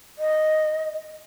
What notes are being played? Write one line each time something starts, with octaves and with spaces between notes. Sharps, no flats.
D#5